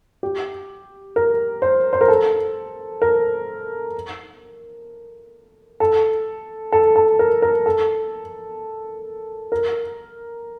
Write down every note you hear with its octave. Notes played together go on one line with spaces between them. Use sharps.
G4
A#4
C5
C5
A#4
A4
A#4
A4
A4
A4
A#4
A#4
A4
A#4